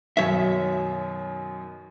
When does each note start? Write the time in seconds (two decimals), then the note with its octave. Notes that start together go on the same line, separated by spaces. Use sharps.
0.17 F#2 B2 D#3 C#5 E5